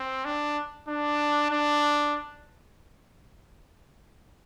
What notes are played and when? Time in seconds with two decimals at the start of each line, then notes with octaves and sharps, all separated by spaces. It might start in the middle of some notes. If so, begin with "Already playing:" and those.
Already playing: C4
0.25 D4
0.88 D4
1.51 D4